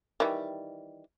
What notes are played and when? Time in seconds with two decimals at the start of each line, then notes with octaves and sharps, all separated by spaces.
0.20 D#3 E3 G3